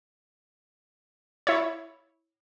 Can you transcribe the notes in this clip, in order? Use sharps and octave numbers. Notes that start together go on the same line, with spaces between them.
E4 C#5